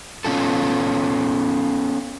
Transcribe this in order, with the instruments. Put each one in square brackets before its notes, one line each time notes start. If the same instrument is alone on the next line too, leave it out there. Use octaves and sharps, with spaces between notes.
[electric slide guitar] B3 C#4 D4 F4 A4